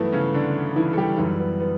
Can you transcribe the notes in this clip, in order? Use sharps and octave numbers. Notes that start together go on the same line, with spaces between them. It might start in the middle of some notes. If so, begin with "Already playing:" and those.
Already playing: G2 E3 F#3 A3 B3 E4
C#3 C#4
D3 D4
E3 E4
A4
G3 G4
F#2 E3 G3 E4
B3
B3